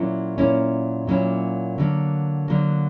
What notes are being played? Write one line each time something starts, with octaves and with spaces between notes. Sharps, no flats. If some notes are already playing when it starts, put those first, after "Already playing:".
Already playing: A#2 F#3 A#3 C#4 E4
A#2 F#3 A#3 C#4 E4
A#2 F#3 A#3 C#4 E4
D3 F#3 A#3
D3 F#3 A#3